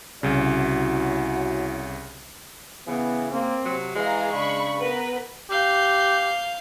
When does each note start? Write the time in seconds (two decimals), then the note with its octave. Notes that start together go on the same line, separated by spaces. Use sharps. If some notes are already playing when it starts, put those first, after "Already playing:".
0.23 C2 C#3 E4 F#4 C#5
2.88 C#3 E3 B3
3.32 A#3 C4
3.65 C3 F#3
3.96 E3 G#3 G#4 F5 A#5
4.33 C#3 D4 B5 C#6
4.77 B3 A#4 B4
5.50 G4 F5 G6